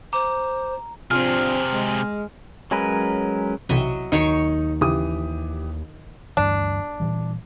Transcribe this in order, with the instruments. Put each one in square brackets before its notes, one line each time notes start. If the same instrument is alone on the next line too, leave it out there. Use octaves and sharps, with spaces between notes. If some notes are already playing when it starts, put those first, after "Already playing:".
[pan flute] C5 [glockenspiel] A#5 [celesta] D6
[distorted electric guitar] C3 G#4 [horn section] F3 D4 F4 [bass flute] C4 [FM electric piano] F6
[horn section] G#3
[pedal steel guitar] F#3 G#3 C#4 A#4 B4
[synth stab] B1 C3 E3 [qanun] F#3 D#5 E5
[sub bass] D#2 [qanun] D#3 C#5 C#6 [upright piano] D#4
[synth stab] C#3 [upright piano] E3 G4 D#6
[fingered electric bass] D2 G2 E3 [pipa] D4
[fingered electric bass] A#2 E3 G3